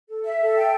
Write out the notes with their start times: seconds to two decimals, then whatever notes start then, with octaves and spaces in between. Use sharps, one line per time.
0.08 A4
0.24 E5
0.41 A4
0.56 G5